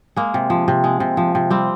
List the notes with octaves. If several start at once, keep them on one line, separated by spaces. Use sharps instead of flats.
G#3 A#3
C3
F3
C3
G#3
C3
F3
C3
G3 C4